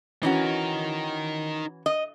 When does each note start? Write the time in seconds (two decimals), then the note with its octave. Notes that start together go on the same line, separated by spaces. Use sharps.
0.23 E3 C#4 D#4 F#4 A#4
1.86 D#5